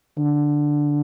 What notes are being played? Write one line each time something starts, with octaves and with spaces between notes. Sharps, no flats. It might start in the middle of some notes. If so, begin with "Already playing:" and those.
D3